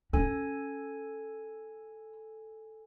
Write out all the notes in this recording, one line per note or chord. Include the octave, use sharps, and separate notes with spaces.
C#4 A4 G#5